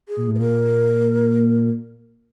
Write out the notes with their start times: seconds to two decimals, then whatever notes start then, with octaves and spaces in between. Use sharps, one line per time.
0.09 G#4
0.16 A#2
0.28 A2
0.35 B4
0.39 A#2 A#4